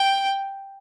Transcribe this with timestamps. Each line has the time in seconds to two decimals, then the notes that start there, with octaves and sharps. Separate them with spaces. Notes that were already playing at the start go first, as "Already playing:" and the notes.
Already playing: G5